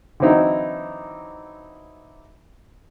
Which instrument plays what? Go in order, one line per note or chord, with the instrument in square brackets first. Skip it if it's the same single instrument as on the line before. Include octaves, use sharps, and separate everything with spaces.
[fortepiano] D3 E3 F#3 C4 D#4 E4